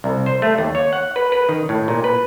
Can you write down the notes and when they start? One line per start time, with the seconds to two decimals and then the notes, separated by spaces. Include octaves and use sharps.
0.04 C2
0.26 C5
0.42 A3
0.58 D#2
0.75 C#5
0.93 F#5
1.16 B4
1.32 B4
1.49 D#3
1.69 A2
1.88 A#2
2.04 B4